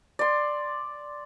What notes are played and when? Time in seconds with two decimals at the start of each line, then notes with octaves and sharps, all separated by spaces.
0.19 D5 C6